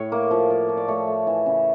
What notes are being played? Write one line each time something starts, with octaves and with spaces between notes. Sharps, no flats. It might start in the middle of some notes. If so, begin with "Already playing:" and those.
Already playing: A2 C#5
A#3
F3
F3
F3
D5
A3 C#5
A3
E3
C#3